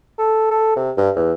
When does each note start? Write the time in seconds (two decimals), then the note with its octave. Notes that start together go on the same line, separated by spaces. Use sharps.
0.18 A4
0.51 A4
0.76 C3
0.97 G2
1.16 E2